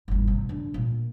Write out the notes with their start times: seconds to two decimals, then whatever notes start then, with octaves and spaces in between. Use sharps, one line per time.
0.08 G1 E2
0.28 C3
0.49 D3
0.74 A#2